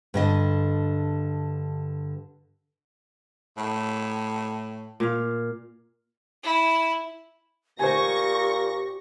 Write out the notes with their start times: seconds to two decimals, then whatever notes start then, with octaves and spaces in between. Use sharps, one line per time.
0.14 G2 D3 D#5
3.58 A2
5.00 A#2 F5
6.43 E4
7.79 A#2 G4 C5 G#5 C#6 A#6